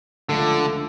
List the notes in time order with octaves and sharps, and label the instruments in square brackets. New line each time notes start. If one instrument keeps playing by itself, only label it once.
[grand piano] C#2 F3 A3 [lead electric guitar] D3